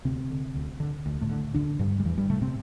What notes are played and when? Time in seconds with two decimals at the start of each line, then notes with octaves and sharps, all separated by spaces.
0.05 D2 C3 C4
0.30 D3
0.55 D2
0.80 D3
1.06 D2
1.21 A2 A3
1.29 D3
1.54 D2 D3 D4
1.79 G2 D3 G3
2.00 G3
2.05 E2 E3
2.18 G2 G3
2.30 A2 C3 A3
2.42 C3 C4